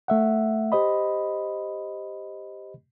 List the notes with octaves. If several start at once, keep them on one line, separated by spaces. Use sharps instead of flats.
A3 E5 F#5
G4 C5 D#5 B5